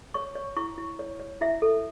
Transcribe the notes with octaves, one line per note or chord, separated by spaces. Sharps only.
C#5 C#6
C#5
E4 C#6
E4
C#5
C#5
E4 E5
A4